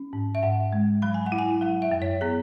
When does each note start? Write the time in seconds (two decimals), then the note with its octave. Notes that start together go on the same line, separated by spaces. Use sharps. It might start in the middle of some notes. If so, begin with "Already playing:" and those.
Already playing: C#4
0.13 G#2
0.35 E5
0.42 G#2 F#5
0.73 G#3
1.02 F#3 B5
1.14 G#5
1.26 F#5
1.32 E4
1.39 G#5
1.61 F#3 F#5
1.82 E5
1.91 F#2
2.02 C#5
2.21 B3 G#4